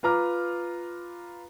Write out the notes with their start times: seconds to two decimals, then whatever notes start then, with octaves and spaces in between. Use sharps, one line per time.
0.03 F4 B4 A#5 D6 F6